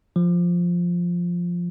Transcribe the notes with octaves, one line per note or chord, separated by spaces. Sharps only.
F3